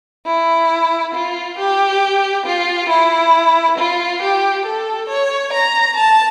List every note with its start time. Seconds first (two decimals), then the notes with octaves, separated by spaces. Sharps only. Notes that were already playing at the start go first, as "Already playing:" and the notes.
0.26 E4
1.15 F4
1.58 G4
2.46 F4
2.90 E4
3.78 F4
4.22 G4
4.65 A4
5.09 C#5
5.53 A#5
5.97 A5